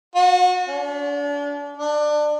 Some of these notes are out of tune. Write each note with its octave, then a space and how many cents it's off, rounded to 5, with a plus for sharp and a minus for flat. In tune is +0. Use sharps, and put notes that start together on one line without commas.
F#4 -30
D4 -35
D4 +25